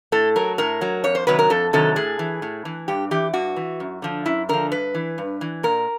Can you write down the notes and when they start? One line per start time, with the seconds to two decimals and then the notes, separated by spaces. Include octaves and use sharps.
0.12 A2 A4
0.36 F#3 A#4
0.58 A2 A#4
0.81 F#3
1.04 F2 C#5
1.15 C5
1.27 C3 D#3 F#3 B4
1.39 A#4
1.50 F2 A4
1.73 C3 D#3 F#3 A4
1.96 A2 G#4
2.19 E3
2.42 A2
2.65 E3
2.88 G2 G4
3.11 E3 G4
3.34 G2 F#4
3.56 E3
3.80 F#2
4.02 D3 F3
4.26 F#2 E4
4.49 D3 F3 A#4
4.71 G2 B4
4.95 E3
5.18 G2
5.41 E3
5.63 A#2 A#4